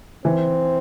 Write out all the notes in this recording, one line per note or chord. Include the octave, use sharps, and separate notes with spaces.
E3 C4